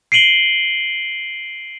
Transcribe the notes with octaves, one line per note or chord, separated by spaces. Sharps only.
C7 D7 D#7 F#7 G7